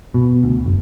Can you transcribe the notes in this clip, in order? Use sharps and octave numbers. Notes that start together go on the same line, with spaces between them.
B2
D2
F#1